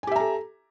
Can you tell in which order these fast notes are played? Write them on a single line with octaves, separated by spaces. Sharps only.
G#5 G4 E5 A#5 A4